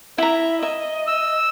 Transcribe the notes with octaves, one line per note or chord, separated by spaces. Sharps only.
E4 E5 A#5
D#5 E5
E6